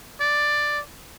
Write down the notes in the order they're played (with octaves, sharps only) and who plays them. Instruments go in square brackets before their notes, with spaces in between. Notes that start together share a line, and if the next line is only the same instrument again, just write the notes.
[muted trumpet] D5